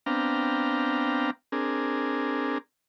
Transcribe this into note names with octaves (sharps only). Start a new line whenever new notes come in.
B3 C4 D4 F5 G5 A#5
C4 D4 G#4 A#4